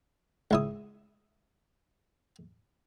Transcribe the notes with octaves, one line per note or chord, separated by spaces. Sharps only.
C#2 E4 D#6